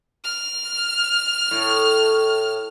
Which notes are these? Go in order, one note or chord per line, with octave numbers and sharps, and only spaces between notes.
F6
A2